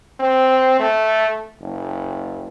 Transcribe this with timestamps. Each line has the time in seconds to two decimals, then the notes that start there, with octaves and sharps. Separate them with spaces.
0.20 C4
0.80 A3
1.60 F#1